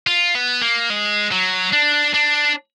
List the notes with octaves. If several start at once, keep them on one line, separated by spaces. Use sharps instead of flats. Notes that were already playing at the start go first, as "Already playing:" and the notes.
F4
B3
A#3
G#3
F#3
D4
D4